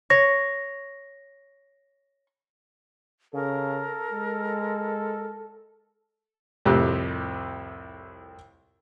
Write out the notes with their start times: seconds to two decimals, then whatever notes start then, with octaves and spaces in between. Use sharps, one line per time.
0.10 C#5 A#6
3.34 C#3 A4 A#4
4.12 G#3
6.65 C2 F2 A2 C3 G4 F#6